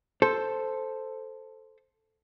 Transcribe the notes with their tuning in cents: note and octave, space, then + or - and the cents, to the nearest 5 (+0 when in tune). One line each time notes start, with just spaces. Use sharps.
A4 +0 C5 +0